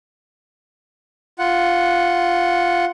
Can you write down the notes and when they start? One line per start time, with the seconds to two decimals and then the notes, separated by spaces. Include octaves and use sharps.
1.39 F4 F#5